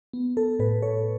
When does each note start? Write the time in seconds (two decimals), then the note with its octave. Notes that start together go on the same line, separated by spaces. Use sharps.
0.13 B3
0.37 A4
0.59 A2 B4
0.82 A4 C#5